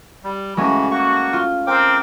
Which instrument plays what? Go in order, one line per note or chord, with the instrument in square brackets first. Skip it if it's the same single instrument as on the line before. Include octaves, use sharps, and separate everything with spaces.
[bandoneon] G3
[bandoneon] C#3 E3 F#4 [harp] G#3 A3 C#4
[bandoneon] A#3 C#6 [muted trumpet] F#4
[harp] F4
[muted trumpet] C4 [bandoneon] A#4 G5 D6